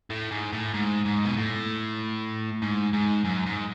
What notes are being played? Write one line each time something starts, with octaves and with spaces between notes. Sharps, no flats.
A2
G#2
A2
G#2
G#2
B2
A2
G#2
G#2
F#2
G#2